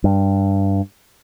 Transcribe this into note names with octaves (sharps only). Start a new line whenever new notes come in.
G2